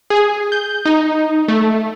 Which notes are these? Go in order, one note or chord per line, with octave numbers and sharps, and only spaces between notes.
G#4
G6
D#4
A3